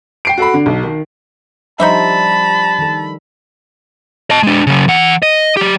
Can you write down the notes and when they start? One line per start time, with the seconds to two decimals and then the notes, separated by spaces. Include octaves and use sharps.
0.25 G5 C7 D7
0.37 F#4 A4 F#5 B5
0.54 D3
0.66 B1
0.83 D#3
1.80 F3 G3 D4 D#4 C5 E5 A5 B5
2.79 D#3 A4
4.30 D#5 A5
4.43 G#3 D4
4.67 C#3 F#3
4.88 E3 F#5
5.22 D#5
5.57 F#3 G4